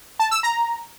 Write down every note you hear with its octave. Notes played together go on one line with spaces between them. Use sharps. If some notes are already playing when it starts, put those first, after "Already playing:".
A5
E6
A#5